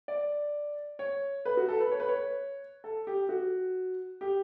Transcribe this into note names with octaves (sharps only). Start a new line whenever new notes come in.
D5
C#5
B4
F#4
A4
B4
C#5
B4
C#5
A4
G4
F#4
G4